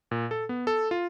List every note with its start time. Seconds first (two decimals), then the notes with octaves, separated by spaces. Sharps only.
0.11 A#2
0.31 A4
0.49 B3
0.67 A4
0.91 F4